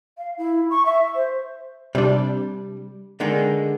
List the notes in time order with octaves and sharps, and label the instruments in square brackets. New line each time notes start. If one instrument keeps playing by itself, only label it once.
[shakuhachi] F5
E4
C#6
E5
C5
[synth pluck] C3 D4 [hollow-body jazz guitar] G3
[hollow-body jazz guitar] D3 D#3 G#3